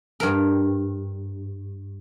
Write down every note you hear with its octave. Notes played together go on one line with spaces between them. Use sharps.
G2 A#4